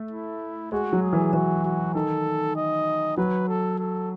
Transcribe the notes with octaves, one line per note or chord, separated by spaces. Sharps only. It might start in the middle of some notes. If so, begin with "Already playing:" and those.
Already playing: A3
E4
G#3 F#4
F#3
G#4
E3
E3 F#4
F#4
D#3 A4
D#5
F#3 B4
A4
A4